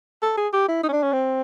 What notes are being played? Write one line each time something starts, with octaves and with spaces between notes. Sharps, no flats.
A4
G#4
G4
E4
D#4
C#4
D4
C#4
C4